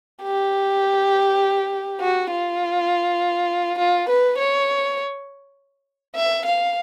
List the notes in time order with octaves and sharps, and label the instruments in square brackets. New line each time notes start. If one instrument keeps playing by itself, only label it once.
[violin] G4
F#4
F4
F4
B4
C#5
E5
F5